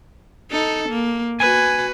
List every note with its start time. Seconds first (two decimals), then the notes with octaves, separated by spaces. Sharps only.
0.51 D#4 A4
0.89 A#3
1.40 F#4 B4 G#5